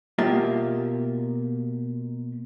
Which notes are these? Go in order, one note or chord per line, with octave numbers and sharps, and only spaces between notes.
B2 A#3 F4 G4 E5